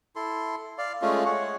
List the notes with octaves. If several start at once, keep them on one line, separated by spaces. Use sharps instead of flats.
E4 A4 C6
D5 F5
G#3 A3 C#4 F4
G#3 C#5 F#5